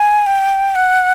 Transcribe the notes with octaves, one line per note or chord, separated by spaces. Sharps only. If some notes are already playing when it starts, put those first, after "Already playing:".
Already playing: G#5
G5
F#5